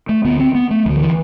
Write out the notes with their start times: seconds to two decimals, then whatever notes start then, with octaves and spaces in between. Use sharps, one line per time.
0.09 A3
0.25 D2 D3 B3
0.40 C4
0.55 B3
0.71 A3
0.85 D2 F3
0.89 D3
0.96 F3
1.01 E3